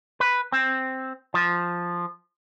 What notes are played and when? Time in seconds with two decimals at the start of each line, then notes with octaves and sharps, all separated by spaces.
0.20 B4
0.52 C4
1.34 F3